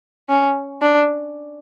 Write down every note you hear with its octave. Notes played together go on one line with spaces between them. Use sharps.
C#4
D4